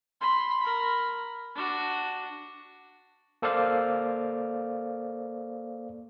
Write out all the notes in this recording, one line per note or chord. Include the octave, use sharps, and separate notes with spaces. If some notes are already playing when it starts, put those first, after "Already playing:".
B5 C6
A#4 B5
D4 F#4
A#3 A4 C5 D5 F5